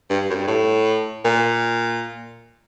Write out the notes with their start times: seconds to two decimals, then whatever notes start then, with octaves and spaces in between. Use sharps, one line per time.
0.10 G2
0.30 F#2
0.35 G2
0.48 A2
1.25 A#2